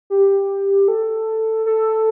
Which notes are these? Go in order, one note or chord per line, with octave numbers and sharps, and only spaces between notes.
G4
A4
A4